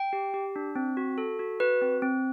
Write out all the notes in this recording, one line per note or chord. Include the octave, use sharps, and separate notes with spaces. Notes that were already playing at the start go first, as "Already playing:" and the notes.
Already playing: G5
G4
G4
D4
C4
F#4
A4
F#4
F#4 B4
C4
C4